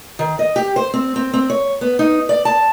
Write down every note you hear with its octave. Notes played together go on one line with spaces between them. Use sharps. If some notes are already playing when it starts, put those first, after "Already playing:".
D#3
D#5
G4
C5
C4
C4
C4
C#5
B3
D#4
D5
A5